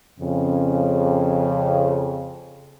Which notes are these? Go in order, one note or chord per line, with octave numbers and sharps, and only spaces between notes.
F2 C#3